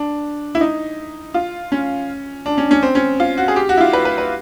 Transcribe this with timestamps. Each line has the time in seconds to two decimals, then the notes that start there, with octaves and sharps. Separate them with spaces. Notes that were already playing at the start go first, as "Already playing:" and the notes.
Already playing: D4
0.55 E4
0.61 D#4
1.34 F4
1.72 C#4
2.46 D4
2.58 C#4
2.71 C#4
2.83 C4
2.95 C#4
3.20 F4
3.37 F#4
3.48 G#4
3.56 G4
3.69 F#4
3.77 E4
3.81 F4
3.93 B4
4.05 B4
4.18 B4